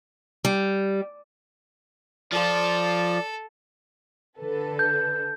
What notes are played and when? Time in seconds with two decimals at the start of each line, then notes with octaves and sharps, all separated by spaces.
0.45 G3
2.32 F3 F4 A4 D5
4.39 D3 A4 B4
4.79 G6